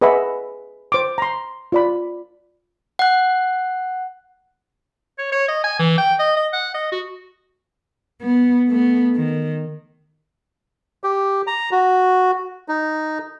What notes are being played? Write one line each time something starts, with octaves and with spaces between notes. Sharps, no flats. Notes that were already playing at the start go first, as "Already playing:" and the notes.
G#4 B4 D#5 E5 F#5 B5
C5 D6
A#5 C6
F4 D5 B5
F#5 F#6
C#5
C#5
D#5
G#5
E3
G5
D#5
D#5
F#5
D#5
F#4
B3
A3 B3
D#3
G4
A#5
F#4
D#4